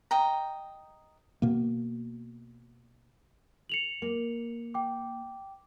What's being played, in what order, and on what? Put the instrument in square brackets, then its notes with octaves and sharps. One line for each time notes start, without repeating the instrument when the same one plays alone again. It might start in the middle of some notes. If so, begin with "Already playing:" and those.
[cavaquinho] D#5 G5 A#5
[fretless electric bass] B2 A#3
[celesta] C#7 F7 F#7
[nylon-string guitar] A#3
[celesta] G5 D6